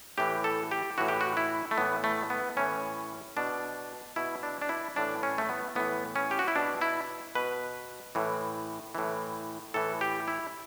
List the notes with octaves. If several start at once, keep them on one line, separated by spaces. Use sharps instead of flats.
A2 E3 G4
A4
G4
A2 E3 F#4
G4
F#4
E4
A3
A2 E3 B3
A3
B3
A2 E3 C#4
B2 D4
B2 E4
D4
D4
E4
A2 E3 D4
C#4
A3
B3
A2 E3 B3
C#4
G4
F#4
E4
B2 D4
E4
B2 B4
A2 E3
A2 E3
A2 E3 A4
G4
E4